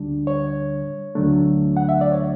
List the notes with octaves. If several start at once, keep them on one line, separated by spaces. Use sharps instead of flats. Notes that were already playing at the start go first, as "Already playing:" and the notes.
Already playing: D2 D3 G3 D4
C#5
D2 D3 F#3 A3 D4
F#5
E5
D5
C#5